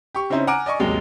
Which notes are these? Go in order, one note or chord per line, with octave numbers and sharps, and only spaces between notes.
G4 C#6
C#3 C4 C#4 D#4 E4 C5
F#5 G#5 A#5 D6 F6 D7
D5 D#5 G#5 C#6
A1 D#2 C3 F#3 G#3